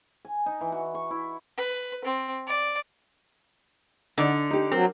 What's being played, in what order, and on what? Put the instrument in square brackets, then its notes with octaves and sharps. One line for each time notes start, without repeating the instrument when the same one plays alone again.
[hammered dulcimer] G#5
D#4
E3
F#4
C#6
E4
[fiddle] B4
C4
D5
[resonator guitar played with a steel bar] D3 [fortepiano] D#4 D5
[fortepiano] D#4 G4
[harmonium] F#3 [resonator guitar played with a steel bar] C4 [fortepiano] A#4